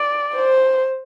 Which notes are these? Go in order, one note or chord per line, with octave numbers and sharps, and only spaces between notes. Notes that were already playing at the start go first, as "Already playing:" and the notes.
Already playing: D5
C5